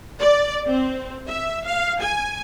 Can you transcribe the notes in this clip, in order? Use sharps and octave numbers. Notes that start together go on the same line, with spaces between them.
D5
C4
E5
F5
G#5